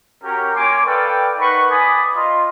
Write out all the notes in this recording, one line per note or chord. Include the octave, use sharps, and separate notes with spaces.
C#4 F#4 G4 A#4
A#3 C#5 G#5 C6 D6
A4 B4 D5 F5 G5
D#4 A#4 B4 F#5 B5 C#6
B4 D5 G#5 B5 D#6
F4 D#5 C6